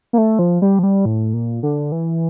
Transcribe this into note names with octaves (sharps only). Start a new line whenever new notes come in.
A#3
A3
F3
G3
F3
G3
A2
A#2
D3
E3